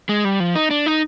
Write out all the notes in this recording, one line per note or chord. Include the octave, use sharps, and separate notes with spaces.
G#3
G3
F3
D#4
D4
D#4